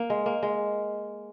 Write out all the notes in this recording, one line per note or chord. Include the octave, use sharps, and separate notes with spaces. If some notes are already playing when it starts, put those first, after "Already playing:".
Already playing: A#3
G#3
A#3
G#3